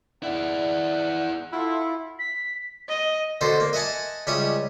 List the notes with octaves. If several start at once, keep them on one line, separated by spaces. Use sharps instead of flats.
E4 G#4 D5 F#5
E4 F4 A4 E5 F#5
B6
D#5
B2 D3 A4 C5
A#3
D#5 E5 F#5 G#5 A5
C#2 G3 C#4 E5 C#6 D#6